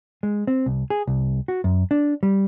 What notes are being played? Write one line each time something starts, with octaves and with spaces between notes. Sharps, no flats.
G#3
C4
C2
G#4
C2
F#4
F#2
D4
G3